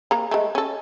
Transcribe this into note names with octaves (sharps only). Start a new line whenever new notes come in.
A#3 A#5
G#3 A3
C#4 A4